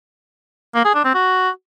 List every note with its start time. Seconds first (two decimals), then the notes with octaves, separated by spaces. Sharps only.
0.75 A#3
0.85 G#4
0.94 D4
1.04 C4
1.14 F#4